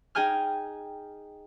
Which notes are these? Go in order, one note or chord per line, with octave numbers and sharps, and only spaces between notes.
D#4 G#4 G5 G#5 F6